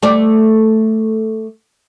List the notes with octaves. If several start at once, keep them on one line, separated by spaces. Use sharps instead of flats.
A3 D5